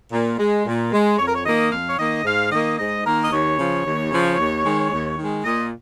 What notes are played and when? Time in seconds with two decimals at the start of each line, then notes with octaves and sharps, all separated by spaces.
0.12 A#2
0.39 G#3
0.66 A#2
0.92 G#3
1.18 F2 C#5
1.27 A#4
1.34 C#5
1.45 D#3 A#3 D#5
1.71 F2 F5
1.87 C#5
1.98 D#3 A#3 D#5
2.25 G#2 F5
2.51 D#3 A#3 D#5
2.78 G#2 D#5
3.04 D#3 A#3 A#4
3.23 D#5
3.31 D#2 C#5
3.58 C#3 F3
3.85 D#2
4.11 C#3 F3
4.38 D#2
4.64 D#3 G#3
4.91 D#2
5.17 D#3 G#3
5.45 A#2 D#5